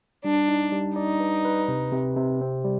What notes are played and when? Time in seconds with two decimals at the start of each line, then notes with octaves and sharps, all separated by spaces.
0.24 G3 D4
0.48 D#4
0.72 G3
0.96 D#4 D5
1.20 B4
1.45 B4
1.68 C3
1.92 C3
2.17 C3
2.41 C4
2.64 G3